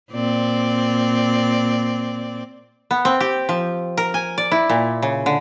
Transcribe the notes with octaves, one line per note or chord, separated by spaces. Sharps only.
A#2 C4 D5
B3
C4
G4
F3
A#4
G#5
D5
E4
A#2
C#3
D3